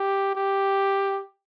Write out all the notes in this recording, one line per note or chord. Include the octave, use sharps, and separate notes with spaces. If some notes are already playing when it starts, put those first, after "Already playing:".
Already playing: G4
G4